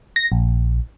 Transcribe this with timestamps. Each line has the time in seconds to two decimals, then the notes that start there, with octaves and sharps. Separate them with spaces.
0.16 A#6
0.32 A#1